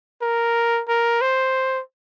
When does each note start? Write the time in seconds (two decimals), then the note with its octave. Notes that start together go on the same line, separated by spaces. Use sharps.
0.22 A#4
0.88 A#4
1.21 C5